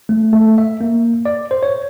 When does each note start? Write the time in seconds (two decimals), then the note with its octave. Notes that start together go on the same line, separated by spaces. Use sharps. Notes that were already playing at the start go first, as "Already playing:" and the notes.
0.09 A3
0.33 A3
0.58 E5
0.81 A#3
1.25 D5
1.51 C5
1.63 C#5